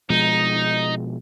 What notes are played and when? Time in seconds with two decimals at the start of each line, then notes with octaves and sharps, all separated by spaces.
0.10 B2 F3 G#3 D#4